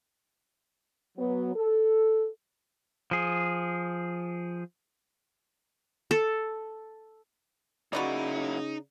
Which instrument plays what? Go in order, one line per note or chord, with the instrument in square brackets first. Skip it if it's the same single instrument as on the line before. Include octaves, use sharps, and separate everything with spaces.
[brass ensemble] F#3 B3
A4
[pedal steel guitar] F3 G#4
[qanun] A4
[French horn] C#3 [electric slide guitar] F#3 A#3 E4 [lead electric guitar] D#4 [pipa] F#4 B4 D5